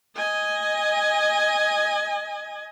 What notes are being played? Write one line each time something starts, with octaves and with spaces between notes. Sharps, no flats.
D#5 G#5